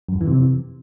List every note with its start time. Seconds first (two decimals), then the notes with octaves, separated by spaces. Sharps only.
0.09 F#2
0.15 F2
0.21 E3
0.27 C3